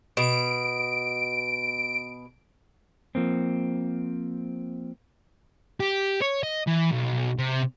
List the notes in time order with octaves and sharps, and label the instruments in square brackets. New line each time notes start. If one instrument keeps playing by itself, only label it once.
[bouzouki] B2 [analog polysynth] D7
[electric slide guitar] F3 A#3 C4
[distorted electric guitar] G4
C#5
D#5
E3
B1
C3